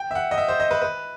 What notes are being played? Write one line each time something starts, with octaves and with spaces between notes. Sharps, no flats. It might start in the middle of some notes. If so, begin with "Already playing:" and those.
Already playing: G5
E5
F#5
D#5
E5
C5
D#5
B4
B4